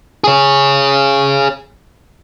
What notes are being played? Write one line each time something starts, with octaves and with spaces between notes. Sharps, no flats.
G#4 C#5